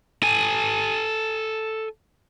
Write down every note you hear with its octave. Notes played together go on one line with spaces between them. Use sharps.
A4 G#5